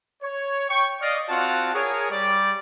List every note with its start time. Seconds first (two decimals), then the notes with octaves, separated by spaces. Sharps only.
0.22 C#5
0.70 G5 C#6
1.01 D5 D#5 F5
1.29 C4 F4 F#4 F5 F#5 A5
1.74 G#4 A#4 C#5
2.10 G3 D5